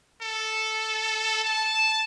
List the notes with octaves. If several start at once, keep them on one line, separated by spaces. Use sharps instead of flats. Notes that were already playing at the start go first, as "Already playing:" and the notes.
A4
A5